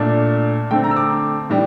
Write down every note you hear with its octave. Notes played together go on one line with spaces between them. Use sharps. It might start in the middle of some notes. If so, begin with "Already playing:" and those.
Already playing: A#2 A3 D4
D3 A3 C4 G5
A#5
E6
D6
A2 E3 G3 D4